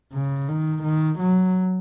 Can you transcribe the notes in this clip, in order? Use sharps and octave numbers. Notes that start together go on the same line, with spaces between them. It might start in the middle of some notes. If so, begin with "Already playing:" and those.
C#3
D#3
D#3
F#3